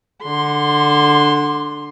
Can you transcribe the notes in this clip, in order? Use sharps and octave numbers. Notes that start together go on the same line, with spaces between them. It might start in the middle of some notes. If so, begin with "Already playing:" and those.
D3 C6